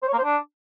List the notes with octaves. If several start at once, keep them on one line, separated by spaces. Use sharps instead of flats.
C5
C#5
A#3
C5
D4